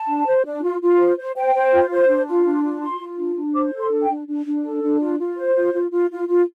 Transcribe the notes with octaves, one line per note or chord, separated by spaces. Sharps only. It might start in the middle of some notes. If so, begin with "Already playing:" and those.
Already playing: A5
D4
C5
D4
F4
F4
C5
C5
C5 G5
C5
F4
C5
D4
F4
D4
F4
F4 C6
F4
D4
D4
C5 D6
A4
C6
D4
G5
D4
D4
D4
A4
D4
F4
F4
C5
F4
F4
F4
F4
F4